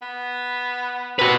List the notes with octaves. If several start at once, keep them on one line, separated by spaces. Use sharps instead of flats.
B3
C3 F#4 B4